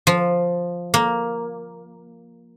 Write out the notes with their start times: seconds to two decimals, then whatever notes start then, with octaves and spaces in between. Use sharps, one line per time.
0.07 F3
0.94 A#3